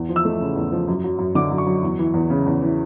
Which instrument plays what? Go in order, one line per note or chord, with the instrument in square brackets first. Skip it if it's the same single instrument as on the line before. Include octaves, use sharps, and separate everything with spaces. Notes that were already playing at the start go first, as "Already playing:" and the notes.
Already playing: [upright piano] E2
F3
E6
A3
C#3
E2
F3
F#2
F#3
F#2
D3 D6
F#2
C#6
F#3
E2
E3
E2
C#3
E2
E3